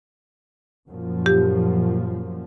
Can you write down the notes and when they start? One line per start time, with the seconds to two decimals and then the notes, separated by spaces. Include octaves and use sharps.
0.88 F#2 A#2 F3
1.26 G4